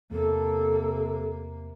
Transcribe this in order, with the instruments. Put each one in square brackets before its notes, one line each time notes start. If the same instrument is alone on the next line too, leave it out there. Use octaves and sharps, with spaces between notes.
[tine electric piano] E2 [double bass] C3 A#3 [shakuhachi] A4